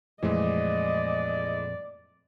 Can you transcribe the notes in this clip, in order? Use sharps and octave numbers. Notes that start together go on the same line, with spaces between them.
F2 A#2 E3 G#3 A3 D5 D#5